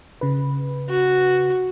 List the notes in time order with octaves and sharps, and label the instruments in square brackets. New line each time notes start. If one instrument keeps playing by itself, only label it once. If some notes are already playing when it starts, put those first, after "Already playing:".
[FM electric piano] C#3 B4
[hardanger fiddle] F#4